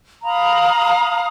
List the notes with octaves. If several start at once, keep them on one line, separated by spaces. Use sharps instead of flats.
F5 A#5 B5 D#6